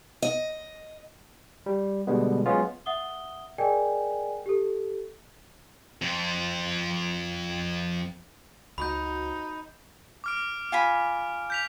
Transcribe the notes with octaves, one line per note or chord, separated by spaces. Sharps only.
D#5
G3
B2 D3 G3 G#3 B3
F#3 G#3 B3 C#4 F4
E5 F#5 D#6 G7
G#4 A#4 D5 D#5 G5 G#5
G4 A4
F2 F3
C#2 D#4 F#4 C5 F#5 B5 G6
D6 F6 D7
F4 G#5 B5
G6 B6 F7